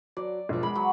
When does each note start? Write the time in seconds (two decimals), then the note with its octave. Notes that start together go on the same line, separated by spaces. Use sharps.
0.17 F#3 D5
0.49 E1 F3
0.63 G#3 B5
0.76 F#3